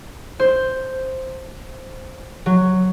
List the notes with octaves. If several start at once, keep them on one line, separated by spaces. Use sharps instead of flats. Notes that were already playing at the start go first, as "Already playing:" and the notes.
C5
F#3